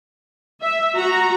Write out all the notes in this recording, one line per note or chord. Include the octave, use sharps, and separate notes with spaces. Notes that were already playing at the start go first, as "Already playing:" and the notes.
E5
F#4 A#5